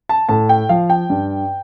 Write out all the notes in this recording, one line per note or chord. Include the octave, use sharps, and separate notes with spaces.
A5
A2 A5
G5
F3 F5
G5
G2